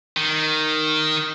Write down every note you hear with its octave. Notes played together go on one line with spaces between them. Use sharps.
D#3